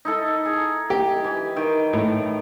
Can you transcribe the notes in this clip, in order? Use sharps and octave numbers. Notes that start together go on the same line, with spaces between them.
D#4 E4 A4
G#4
G4
E3 G#5 B5
D#3 G5
A2